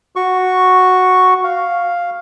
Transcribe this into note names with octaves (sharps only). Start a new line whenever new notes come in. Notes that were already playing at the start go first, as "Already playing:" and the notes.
F#4 C#6
F5